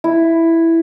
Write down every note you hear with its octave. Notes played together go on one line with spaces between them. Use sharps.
E4